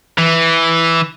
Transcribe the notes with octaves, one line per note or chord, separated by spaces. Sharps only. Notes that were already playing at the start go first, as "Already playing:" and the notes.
E3